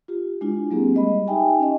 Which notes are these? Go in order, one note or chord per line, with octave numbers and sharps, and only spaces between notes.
F4 G4
G#3 D4 E4 F4 G4
F#3 G#3 A#3 C4 G4 G#4
G3 D#5 B5
D#4 G4 E5 G5 G#5
C#4 G4 D#5